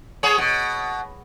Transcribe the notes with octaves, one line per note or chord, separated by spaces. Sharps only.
B3 G#4 C#5
B2